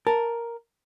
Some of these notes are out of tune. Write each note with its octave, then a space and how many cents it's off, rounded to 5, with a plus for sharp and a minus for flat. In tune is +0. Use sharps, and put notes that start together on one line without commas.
A#4 +0 A5 +0